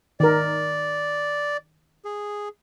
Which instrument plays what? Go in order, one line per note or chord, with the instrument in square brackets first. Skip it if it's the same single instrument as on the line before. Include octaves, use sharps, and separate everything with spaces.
[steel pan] D#3 A#4 [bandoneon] D5
[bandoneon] G#4